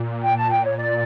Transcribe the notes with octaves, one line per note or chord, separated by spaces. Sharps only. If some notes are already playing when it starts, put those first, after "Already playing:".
Already playing: A#2
G5
A5
G5
C#5
D5